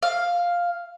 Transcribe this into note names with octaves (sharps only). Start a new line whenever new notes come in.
F5